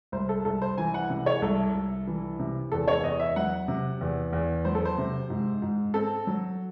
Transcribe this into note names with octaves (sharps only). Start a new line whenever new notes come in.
C2 C5
A4
C2 A4
C5
E3 G#5
F#5
C3
C#5
C2 A4
C2
E3
C3
E2 A4
C#5
E2 D#5
E5
F#3 F#5
C3
E2
E2
F#3 C5
A4
C5
C3
G#2
G#2
C4 A4
F#3